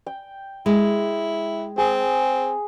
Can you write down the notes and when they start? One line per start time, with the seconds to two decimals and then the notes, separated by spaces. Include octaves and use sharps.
0.06 G5
0.66 G#3 E4
1.78 C4 G#4